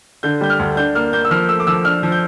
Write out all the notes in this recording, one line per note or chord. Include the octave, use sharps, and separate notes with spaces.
D3 G6
G3 G6
F6
D2
D4 G6
A#3 F6
A#3 G6
E6
F3 F6
A3 E6
D6
F3 E6
D4 F6
F3
G6